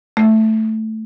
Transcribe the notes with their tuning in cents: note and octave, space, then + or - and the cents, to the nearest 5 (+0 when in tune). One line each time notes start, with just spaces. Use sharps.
A3 +0